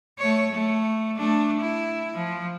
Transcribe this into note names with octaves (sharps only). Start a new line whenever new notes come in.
A3 C#5
A3
A3 D4
E4
F3